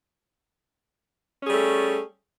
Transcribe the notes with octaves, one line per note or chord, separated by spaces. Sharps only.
G3 A3 C#4 G#4